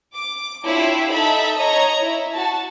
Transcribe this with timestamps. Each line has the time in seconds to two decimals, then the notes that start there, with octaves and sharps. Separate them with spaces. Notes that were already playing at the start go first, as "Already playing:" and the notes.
0.15 D6
0.65 D4 E4 F4 G4 C#5
1.11 D#4 A4 E5 A5 B5
1.58 C#5 D#5 A#5
2.01 E4
2.34 F#4 A5